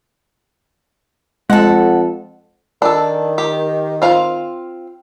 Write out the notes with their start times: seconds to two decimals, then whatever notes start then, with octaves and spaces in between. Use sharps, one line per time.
1.50 F2 G#3 A4 F#5
2.82 D#3 D4 A4
3.38 G4
4.02 C4 F4 F5